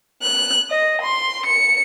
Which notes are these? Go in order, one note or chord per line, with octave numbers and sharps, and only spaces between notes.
F#6
D#5
C6
C#7